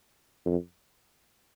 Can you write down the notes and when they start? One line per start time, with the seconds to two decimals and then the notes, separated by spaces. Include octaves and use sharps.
0.46 F2